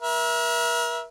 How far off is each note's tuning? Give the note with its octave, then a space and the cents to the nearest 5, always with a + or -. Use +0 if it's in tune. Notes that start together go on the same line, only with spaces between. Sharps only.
A#4 +40 E5 +0